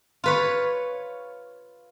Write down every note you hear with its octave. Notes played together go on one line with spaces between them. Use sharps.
F4 B4 C#5